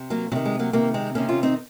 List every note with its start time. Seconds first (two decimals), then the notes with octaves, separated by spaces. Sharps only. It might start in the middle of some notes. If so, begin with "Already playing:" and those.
Already playing: C3
0.10 F#3 A#3
0.32 C3 F#3
0.36 D#3
0.45 G#3
0.59 F#3 A#3
0.73 C3 F#3 A#3
0.77 D#3
0.94 G#3 C4
1.15 C3 D#3 A#3 C#4
1.29 C#4 F4
1.43 C4 D#4